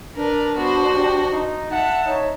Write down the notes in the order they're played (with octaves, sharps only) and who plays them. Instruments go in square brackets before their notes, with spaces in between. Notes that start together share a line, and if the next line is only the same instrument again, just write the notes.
[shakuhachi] D4 [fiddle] A#4 B4
[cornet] B3 [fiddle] F#4 C5
[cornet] G4
D#4
[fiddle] E5 A5 [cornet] F#5
[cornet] D#4 [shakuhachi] C#5